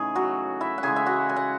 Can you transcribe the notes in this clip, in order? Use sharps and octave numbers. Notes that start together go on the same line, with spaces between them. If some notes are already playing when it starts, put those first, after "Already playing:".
Already playing: C#3 E3 A3 D#4 G#4
F#3 F#4
E4 E5
F#5
C#3 E3 G#3 G#4 G#5
E5
F#4 F#5
G#5
F#5